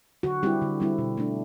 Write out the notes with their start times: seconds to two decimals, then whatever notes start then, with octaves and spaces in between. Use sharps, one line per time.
0.23 D3 F#4
0.43 G3 C4 E4 G4
0.62 D3
0.80 G3 C4 E4
0.98 B2
1.17 A3 D4